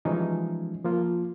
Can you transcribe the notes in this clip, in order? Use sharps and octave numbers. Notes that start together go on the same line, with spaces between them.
E3 F3 G3 G#3 C#4 D#4
F3 A#3 F4